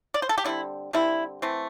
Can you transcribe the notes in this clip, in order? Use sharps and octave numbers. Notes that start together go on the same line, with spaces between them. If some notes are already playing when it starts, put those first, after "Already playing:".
D5
C5
A4
G4
D3 G3 C4 E4
D3 G3 C4 E4
E3 A3 C4